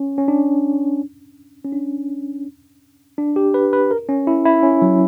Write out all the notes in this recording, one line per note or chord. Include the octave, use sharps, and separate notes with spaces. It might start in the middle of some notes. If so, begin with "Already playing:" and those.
Already playing: C#4
C#4
D4
C#4
D4
D4
G4
B4
B4
A#4
C#4
E4
E4
C#4
F#3